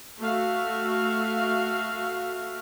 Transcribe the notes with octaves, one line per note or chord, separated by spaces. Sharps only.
A3 F#4 E5 F5